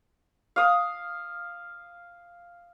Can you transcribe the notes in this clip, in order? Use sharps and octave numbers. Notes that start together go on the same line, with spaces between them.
F5 D#6